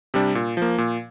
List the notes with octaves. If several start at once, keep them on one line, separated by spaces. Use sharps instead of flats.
C3 G3 D4
A#2
F3 A#3
A#2